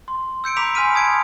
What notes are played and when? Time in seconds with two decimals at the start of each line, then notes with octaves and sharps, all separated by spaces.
0.08 C6
0.44 E6 G6 C#7 D7
0.57 A#5 B5 D6 B6 C#7 F7
0.75 G#5 B5 C6 F6 B6 D#7
0.94 A5 D#6 G#6 D7